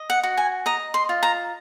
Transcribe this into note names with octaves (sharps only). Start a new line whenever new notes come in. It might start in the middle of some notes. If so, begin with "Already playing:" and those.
Already playing: D#5
F#5
F#4
G#5
D#5 A#5
C6
F4
A#5